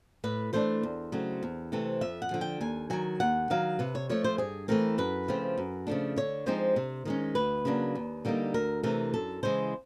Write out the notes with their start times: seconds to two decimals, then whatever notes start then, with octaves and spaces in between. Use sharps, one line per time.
0.24 A2 B4
0.53 E3 A3 D4 C5
0.83 E2
1.12 C#3 F#3 A3 C4
1.43 E2
1.72 C3 E3 A3 C4
2.01 F2 E5
2.22 F#5
2.31 D3 F3
2.41 G5
2.61 D#2 G#5
2.90 D#3 F#3 G#5
3.20 D#2 F#5
3.50 D#3 F#3 F5
3.79 C3 B4
3.95 C#5
4.09 F3 A3 C#5
4.24 C5
4.38 G2 G#4
4.68 E3 A3 C4 A#4
4.98 F#2 B4
5.28 C#3 F3 A3 C4
5.58 F#2
5.87 C#3 F3 A3 D4
6.16 D3 C#5
6.46 F3 G#3 C4 D#4 C5
6.76 C3
7.05 D#3 G#3 C#4
7.35 D2 B4
7.65 C#3 F#3 A#3 D4
7.95 D#2
8.25 D3 G3 A#3 D#4
8.54 D2 A#4
8.83 C3 E3 A3 A#4
9.14 F#2 A4
9.43 C#3 E3 G#3 C5